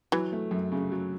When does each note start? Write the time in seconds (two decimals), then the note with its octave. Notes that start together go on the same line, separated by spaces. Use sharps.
0.12 E3 F#3
0.33 A3
0.51 F#2
0.72 C#3
0.92 F#3